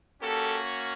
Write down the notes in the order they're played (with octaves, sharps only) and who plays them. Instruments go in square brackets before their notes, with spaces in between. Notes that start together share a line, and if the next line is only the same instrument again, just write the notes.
[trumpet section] A#3 C#4 F#4 G4 A4